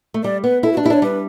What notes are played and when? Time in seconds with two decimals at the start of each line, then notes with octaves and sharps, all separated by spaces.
0.14 A3
0.23 G3 D5
0.44 B3 B4
0.63 E4 A4
0.73 F#4
0.77 D4
0.83 E4 G4
0.90 D4 C#5
1.02 G3 B4